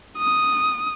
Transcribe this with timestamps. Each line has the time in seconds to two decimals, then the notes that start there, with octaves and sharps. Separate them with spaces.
0.18 D#6